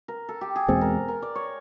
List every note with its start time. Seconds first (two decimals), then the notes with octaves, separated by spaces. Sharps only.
0.08 A#4
0.29 A4
0.41 G4
0.56 G#4
0.68 E2 B2 G#3 C4 A4
0.81 A#4
1.08 A#4
1.22 D5
1.35 C#5